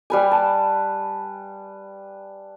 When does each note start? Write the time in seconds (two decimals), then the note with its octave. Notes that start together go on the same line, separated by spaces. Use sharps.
0.10 G3 B4 G#5
0.31 A5